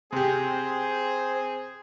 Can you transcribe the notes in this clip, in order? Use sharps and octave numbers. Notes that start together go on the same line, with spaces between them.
C3 C4 G4 G#4 C5